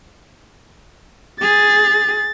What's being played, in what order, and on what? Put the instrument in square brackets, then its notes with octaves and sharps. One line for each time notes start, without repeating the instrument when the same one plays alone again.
[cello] G#4 [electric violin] A6